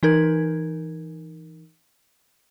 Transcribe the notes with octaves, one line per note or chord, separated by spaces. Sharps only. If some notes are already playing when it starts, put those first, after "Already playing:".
E3 D#4 A#4 G#6